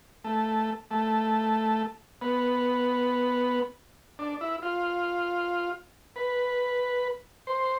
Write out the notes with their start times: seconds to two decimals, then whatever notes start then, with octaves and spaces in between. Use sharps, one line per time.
0.24 A3
0.91 A3
2.21 B3
4.19 D4
4.41 E4
4.62 F4
6.16 B4
7.47 C5